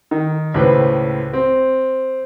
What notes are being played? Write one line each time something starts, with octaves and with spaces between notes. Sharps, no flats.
D#3
C#2 A2 B4 C5
C4